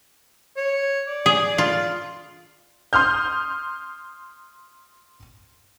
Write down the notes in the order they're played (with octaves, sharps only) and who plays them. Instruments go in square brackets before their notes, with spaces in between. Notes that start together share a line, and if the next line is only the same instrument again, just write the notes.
[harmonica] C#5
D5
[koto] G#4
F4
[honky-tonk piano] C6 D#6 F6 G6